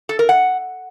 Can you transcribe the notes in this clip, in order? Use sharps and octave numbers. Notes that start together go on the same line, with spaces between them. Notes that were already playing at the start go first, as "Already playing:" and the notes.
A4
A#4
F#5